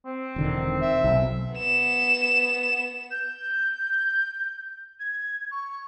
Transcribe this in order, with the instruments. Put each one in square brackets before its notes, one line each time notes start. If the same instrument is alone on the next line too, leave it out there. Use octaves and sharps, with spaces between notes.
[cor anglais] C4
[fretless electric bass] E1 D3 D#3
[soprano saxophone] E5
[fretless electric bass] B1
[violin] B3 E7
[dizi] G6
G#6
C#6